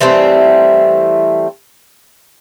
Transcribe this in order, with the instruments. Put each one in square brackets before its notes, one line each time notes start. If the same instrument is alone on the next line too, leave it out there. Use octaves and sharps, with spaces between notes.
[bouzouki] E3 G3 A3 C4